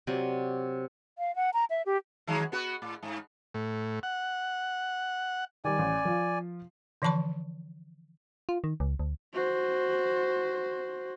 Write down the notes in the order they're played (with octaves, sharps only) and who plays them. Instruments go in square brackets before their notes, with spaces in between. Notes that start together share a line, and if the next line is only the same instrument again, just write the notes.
[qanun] C3 F#3 D5
[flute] F5
F#5
A#5
E5
G4
[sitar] D#3 F#3 G#3
B3 F#4 B4
A2
G#2
[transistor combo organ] A2
F#5
[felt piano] D#3 G3 [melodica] D5 G#5
[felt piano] A1
F3 F4
[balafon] D3 E3 F3 A5 B5 C#6
[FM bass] F4
D#3
C#2
D2
[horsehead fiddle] F#4 C5